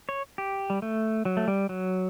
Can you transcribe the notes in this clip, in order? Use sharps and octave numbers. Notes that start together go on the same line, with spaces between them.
C#5
G4
G3
A3
F#3
A3
G3
F#3